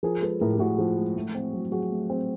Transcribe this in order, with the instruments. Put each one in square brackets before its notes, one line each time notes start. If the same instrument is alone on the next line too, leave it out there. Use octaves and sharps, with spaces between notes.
[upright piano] F3 [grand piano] G#4 A#4
[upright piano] G#3 [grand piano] A4 B4
[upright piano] A2 [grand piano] G#4 A#4
[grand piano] G4
[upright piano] A2 [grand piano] F#4 G#4
[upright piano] F3
G#3
A3
C4
F#3
[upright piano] F#3 [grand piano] F#4 G#4
[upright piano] A3
C4